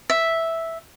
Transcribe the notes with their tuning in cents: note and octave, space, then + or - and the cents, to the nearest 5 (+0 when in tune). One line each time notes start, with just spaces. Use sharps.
E5 -5